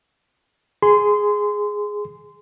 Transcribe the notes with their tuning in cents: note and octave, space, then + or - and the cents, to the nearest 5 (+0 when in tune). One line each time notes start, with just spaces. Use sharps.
G#4 +0 C6 -25